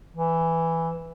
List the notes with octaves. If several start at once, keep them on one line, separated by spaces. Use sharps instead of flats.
E3